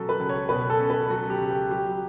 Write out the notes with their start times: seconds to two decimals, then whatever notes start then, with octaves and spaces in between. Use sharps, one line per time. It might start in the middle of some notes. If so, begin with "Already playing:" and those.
Already playing: B2 F#3 C#4 A4
0.09 B4
0.20 C#2
0.29 C#5
0.49 B2 B4
0.70 A4
0.80 C#4
0.90 B4
1.10 F#3 F#4
1.30 G4
1.40 C#2
1.50 G4
1.71 F#3 G4